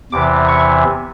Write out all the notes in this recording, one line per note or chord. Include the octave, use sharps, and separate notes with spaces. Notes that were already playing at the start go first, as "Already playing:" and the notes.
E2 C3 E3 D6
C#6